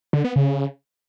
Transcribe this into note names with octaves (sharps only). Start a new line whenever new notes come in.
D3
B3
C#3